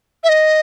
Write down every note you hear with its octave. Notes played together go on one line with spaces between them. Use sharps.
E5
D#5